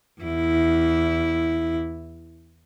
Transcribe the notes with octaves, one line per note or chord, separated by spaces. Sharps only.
E2 E4